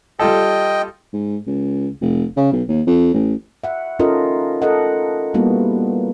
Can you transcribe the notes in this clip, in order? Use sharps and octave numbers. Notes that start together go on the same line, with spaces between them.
G3 F4 A4 D#5 G5
G#2
C#2
F1
C#3
B1
D#2
F2
A1
E5 F#5
C#4 D#4 F4 A4 A#4 D#5
A4 A#4 D#5 F#5
G3 A#3 B3 D#4 E4 F#4